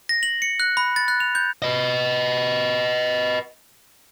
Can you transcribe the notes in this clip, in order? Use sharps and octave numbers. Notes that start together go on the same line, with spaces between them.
A#6
F#7
C#7
F#6
B5
A6
F#6
F7
G6
B4 D#5